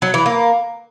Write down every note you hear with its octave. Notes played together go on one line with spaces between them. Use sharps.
F#3
E3
A#3